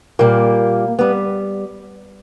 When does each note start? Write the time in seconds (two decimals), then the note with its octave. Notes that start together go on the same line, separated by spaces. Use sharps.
0.19 A#2 G3 A#3
0.99 G3 B3